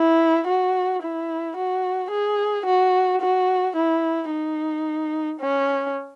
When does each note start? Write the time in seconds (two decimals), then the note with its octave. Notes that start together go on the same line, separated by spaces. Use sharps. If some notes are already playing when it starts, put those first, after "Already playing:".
Already playing: E4
0.47 F#4
1.02 E4
1.57 F#4
2.11 G#4
2.66 F#4
3.21 F#4
3.76 E4
4.31 D#4
5.40 C#4